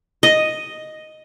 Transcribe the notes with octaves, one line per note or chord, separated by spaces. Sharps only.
D#5